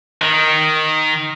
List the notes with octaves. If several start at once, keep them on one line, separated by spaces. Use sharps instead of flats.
D#3